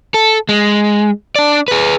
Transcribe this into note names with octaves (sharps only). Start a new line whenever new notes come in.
A4
G#3
D4 D5
G#4 B4